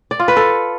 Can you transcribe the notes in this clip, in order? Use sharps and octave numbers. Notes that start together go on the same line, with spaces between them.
D5
F4
B4
A4